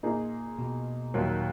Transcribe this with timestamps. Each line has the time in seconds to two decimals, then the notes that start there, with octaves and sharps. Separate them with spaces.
0.03 A#2 A#3 D#4 G#4
0.59 B2
1.14 D#2 A#2 D#3 F#3